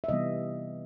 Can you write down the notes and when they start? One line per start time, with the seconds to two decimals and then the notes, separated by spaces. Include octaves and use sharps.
0.04 E5
0.08 C3 E3 G3 B3 D#5